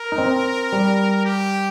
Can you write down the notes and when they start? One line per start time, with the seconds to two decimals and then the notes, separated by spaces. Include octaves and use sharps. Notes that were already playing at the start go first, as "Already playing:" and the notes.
Already playing: A#4
0.12 D#4
0.18 C4
0.73 G3
1.25 G4